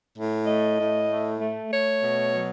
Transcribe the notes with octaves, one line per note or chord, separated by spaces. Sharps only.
A2
A3 D#5
A2
A3
A3
A3 C#5
B2
F#3